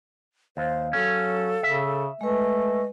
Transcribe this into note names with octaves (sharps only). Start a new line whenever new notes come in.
D#2 C5 F5
F#3 C#4 A4
C#3 E5
G#3 A3 B4 D#5